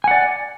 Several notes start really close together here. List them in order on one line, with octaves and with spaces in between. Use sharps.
G#5 F#5 D5